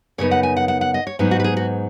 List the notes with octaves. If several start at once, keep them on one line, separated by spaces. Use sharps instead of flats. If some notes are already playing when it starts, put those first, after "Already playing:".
F#2 C#3 B3 D#4 C#5
F#5
G#5
F#5
F#5
F#5
D#5
C#5
G#2 F#3 B3 D#4
F#4
B4
G#4
F#4